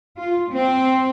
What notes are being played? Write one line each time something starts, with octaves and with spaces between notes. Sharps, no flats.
F4
C4